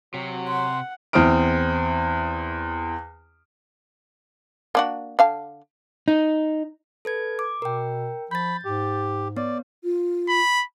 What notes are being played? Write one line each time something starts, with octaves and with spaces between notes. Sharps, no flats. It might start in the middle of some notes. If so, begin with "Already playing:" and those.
C3 F#3
F#5 C6
E2 C4 D#6 F6 D7
A#3 D4 F#4
D3 F5 A5
D#4
A4 B4 G#6
D6
B2 A#4 G5
F3 B5 G6 A6
G#2 G4
B3 C#5 D5
F4
B5